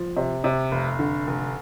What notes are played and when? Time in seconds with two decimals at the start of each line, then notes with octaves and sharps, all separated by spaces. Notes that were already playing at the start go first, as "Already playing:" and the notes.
Already playing: F3
0.17 C3
0.44 C3
0.71 F1
0.99 D3
1.27 F1